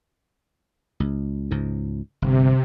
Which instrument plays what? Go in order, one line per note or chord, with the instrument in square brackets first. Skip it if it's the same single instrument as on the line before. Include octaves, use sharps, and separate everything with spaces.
[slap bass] C#2
C#2 G#2
[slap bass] G1 [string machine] C3